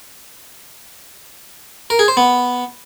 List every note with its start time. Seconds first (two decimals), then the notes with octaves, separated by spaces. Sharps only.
1.90 A#4
1.99 G#4
2.08 C5
2.17 B3